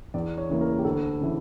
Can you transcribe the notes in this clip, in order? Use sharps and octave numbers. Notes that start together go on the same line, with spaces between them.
E2 D5
C#5
C#3 E3 A#3
A#4
G4
D2 A4
C#3 E3